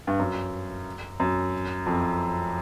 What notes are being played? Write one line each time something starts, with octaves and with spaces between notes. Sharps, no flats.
G2
F#2
F#2
F2